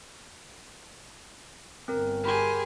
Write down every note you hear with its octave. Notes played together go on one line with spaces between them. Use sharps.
G1 C4 A#4
G4 G#4 A#4 B5 C6